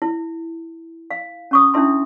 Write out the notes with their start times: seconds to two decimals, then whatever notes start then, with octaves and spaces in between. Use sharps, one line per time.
0.02 E4
1.11 F5
1.51 C#4 C#6 D#6
1.74 C#4 D4 E4 E5 C6